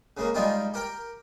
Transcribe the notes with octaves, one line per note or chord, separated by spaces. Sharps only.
C#3 G#3 A#3
G3 G#3 D#4 F4 G4
G4 A#4 G5